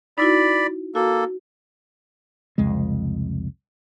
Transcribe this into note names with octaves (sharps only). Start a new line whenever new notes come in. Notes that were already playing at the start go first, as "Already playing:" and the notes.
D#4 E4 F#4 D5 B5
A#3 F#4 A4
C2 F2 C#3 G#3